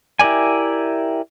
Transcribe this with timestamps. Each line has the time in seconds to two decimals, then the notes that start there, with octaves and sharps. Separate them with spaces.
0.19 E4 G4 A#4 D5 G#5